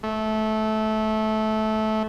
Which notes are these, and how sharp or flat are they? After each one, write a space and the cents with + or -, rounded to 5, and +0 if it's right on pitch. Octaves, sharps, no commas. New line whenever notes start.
A3 -20